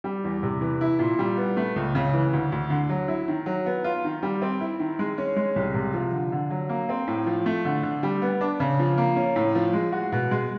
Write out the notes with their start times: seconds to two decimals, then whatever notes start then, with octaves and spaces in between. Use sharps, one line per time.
0.04 G3
0.24 E2
0.43 C3
0.61 E3
0.81 E4
0.99 A#2
1.19 G3
1.37 B3
1.57 A3
1.76 C#2
1.95 C#3
2.13 E3
2.33 D2
2.52 D2
2.70 D3
2.89 F#3
3.08 E4
3.28 D#3
3.46 F#3
3.66 B3
3.84 F4
4.04 D#3
4.23 G3
4.42 C4
4.60 E4
4.79 D#3
4.99 G#3
5.18 C#4
5.37 G#3
5.56 C2
5.74 C3
5.94 F3
6.12 D3
6.32 D3
6.50 F#3
6.69 A#3
6.89 C4
7.07 A2
7.26 F3
7.46 A3
7.65 D3
7.83 D3
8.03 G3
8.22 B3
8.41 D4
8.60 C#3
8.79 F3
8.98 A#3
9.16 C#4
9.36 A2
9.55 F3
9.73 G#3
9.92 F#4
10.12 B2
10.31 G#3